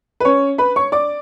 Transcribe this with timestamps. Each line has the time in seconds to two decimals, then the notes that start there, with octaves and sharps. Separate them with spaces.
0.20 B4
0.25 C#4 C#5
0.58 B4 B5
0.76 C#5 C#6
0.92 D5 D6